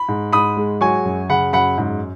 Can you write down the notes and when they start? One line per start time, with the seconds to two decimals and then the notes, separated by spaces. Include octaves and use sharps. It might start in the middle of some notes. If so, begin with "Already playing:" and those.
Already playing: B5
0.09 G#2
0.33 G#2 B5 D#6
0.57 G#3
0.81 F#3 G#5 C#6
1.05 F#2
1.29 C#3 F#5 B5
1.53 F#2 F#5 B5
1.78 G#2